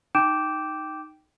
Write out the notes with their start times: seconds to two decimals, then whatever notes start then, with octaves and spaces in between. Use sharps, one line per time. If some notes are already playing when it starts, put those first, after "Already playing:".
0.15 D#4 G5 D6 G6 D7 E7